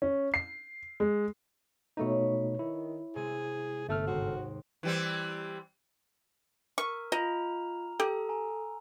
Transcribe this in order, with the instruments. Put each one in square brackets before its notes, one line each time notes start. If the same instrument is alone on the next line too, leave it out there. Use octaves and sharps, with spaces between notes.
[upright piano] C#4
C7
G#3
[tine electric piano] B2 A3 D#4 [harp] B4 C#5
[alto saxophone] D#3 [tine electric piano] E4
[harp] C3 G#3 [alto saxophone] G#4
[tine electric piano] G1 A4 F6 [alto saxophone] A3
[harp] D#2 G#2 C5 [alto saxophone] F#4
[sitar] E3 G3 C4
[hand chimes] A#4 [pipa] C#6 [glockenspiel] F6
[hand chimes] F4 [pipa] D#5 [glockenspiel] A#5 F7
[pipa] G4 [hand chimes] A4 [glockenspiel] E6
[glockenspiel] G#5 A#5